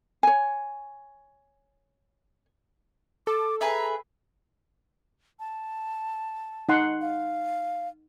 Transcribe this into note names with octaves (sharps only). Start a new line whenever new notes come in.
C#5 G#5
A4 D6
G#4 B4 E5 A#5
A5
D#4 F#5 C6
F5